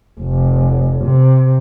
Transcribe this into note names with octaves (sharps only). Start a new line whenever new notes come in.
F1
C3